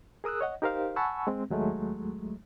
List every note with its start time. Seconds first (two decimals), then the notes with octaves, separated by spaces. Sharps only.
0.24 G#4 A#4 D#6 E6 F#6
0.41 C#5 D#5 F#5
0.62 D#4 G4 A#4 C5 F5
0.96 F#5 G#5 A5 B5 C#6 E6
1.27 G#3 C4
1.50 D#2 F#3 G#3 A3